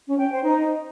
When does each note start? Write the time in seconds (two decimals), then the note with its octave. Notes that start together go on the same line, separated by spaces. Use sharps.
0.07 C#4
0.19 G5
0.31 C5
0.42 D#4